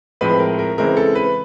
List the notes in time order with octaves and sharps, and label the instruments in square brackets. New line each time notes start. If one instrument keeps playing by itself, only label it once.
[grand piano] A2 F3 G#3 C4 B4
A#4
A#4
C#3 E3 G#3 C4 A#4
A4
B4